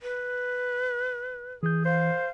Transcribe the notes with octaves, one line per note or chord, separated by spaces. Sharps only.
B4
E3 G#4 G6
C5 F5